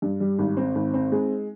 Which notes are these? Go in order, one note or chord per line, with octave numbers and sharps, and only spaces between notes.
G2
G3
G#1
C4
G#1
C4
G#3